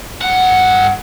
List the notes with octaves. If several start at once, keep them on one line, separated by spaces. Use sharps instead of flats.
G2 F#5